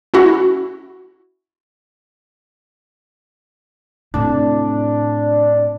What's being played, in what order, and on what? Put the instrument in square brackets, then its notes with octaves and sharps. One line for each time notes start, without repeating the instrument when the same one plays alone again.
[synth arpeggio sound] C#4 E4 F#4
[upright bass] A2 C3 [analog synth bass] D4